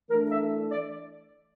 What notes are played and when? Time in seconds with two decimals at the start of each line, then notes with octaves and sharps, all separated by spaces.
0.10 E3 A3 D4 A#4
0.31 E5
0.70 D5